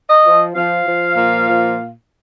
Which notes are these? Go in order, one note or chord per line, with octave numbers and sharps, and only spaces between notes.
D#5
F3
F3 F5
F3
A#2
F3